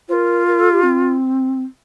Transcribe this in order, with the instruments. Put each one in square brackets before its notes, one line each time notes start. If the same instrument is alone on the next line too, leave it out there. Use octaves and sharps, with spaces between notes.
[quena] F4 [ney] A#4 C5
[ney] A#4
A4
G4
C4